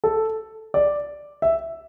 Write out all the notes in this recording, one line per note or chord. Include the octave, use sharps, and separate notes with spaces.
A4
D5
E5